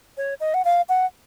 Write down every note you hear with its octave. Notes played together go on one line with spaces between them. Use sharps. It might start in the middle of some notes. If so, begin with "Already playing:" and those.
C#5
D#5
F#5
F5
F#5